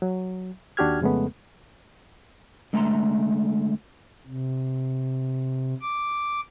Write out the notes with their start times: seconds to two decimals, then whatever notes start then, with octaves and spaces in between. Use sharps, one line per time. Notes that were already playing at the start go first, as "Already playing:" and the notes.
0.02 F#3
0.77 D#2 D4 F#4 G4 F6 G#6
1.01 F2 C#3 G#3 A3 B3
2.73 D3 G#3 A3 E5 A#5 C6
4.27 C3
5.82 D6